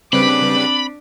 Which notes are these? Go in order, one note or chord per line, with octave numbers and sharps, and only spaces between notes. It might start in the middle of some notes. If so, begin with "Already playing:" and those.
C#3 G3 C4 D4 B4 B5 D6